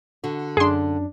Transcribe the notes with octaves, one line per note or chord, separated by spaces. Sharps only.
D3 F#4
F#2 D4 G#4 C6